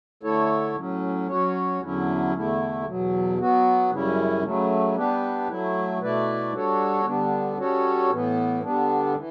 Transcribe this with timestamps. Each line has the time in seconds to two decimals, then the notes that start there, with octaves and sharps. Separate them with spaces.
0.23 D3 A3 E4 A4 C#5
0.76 A2 F#3 C#4
1.28 F#3 C#4 F#4 C#5
1.81 E2 D3 F#3 C#4 E4
2.33 E2 D3 A3 E4
2.86 E2 B2 F#3
3.38 F#3 B3 F#4
3.90 F#2 C#3 G3 C#4 E4
4.43 C#3 F#3 A3
4.95 G3 B3 D4 G4 B4
5.48 F#3 A3 E4
6.01 B2 A3 E4 B4 D5
6.53 G3 D4 F#4 A4 C#5
7.05 D3 G3 B3 D4
7.57 G3 C#4 F#4 A4 C#5
8.10 A2 E3 B3
8.63 D3 G3 B3 D4
9.16 E3